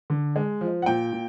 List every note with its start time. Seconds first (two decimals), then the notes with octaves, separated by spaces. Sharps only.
0.10 D3
0.36 G#3
0.61 F3
0.82 F#5
0.86 A#2 G5
1.12 A#2